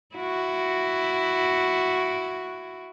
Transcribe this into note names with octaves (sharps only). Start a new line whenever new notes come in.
E4 F#4